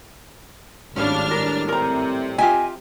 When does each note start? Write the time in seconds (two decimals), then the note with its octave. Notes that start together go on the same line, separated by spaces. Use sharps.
0.96 G#1 A2 G3 C#4 D4 F5 F6
1.31 A#4
1.68 C3 A#4 A#5
2.38 F4 G4 D#5 E5 G#5